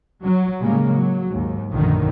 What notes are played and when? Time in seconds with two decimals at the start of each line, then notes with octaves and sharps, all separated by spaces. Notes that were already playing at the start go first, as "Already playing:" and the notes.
0.24 F#3
0.61 A2 C#3 G3 G#3 A#3
0.89 F#3
1.28 D#2 G#2
1.70 A#1 F#2 A2 D3 D#3